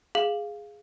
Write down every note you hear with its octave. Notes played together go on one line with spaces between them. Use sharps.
G#4 F5 F#7